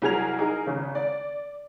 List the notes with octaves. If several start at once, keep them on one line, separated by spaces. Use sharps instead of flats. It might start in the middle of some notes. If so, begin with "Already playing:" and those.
C2 F#3 G#4 A#4 G#6 F7
D#4 G#4 A#4
G#1 C#3
D5